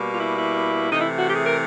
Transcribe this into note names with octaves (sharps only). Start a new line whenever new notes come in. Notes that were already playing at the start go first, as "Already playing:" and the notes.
Already playing: B2 G3 A#3
F4
E4
E4
C3 E3 A3 D#4
E4
F#4
G4
G#4
A#4